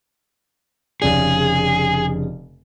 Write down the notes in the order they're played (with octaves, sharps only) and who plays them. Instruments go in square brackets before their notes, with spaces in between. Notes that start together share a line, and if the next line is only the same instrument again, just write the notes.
[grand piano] F1 C#3 D5 [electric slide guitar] G#4